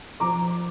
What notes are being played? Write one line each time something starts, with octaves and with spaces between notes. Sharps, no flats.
F3 A#5 D6